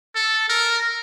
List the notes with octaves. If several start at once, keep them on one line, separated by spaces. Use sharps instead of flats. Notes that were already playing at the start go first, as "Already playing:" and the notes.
A4
A#4